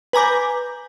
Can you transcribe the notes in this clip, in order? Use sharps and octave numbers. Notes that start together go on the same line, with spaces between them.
B4 G#5 A#5 D6 G6